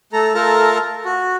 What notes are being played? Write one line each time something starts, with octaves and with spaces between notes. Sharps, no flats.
A3 A4 A#5
A3 F4 A4 A#4 A5 A#5
F#4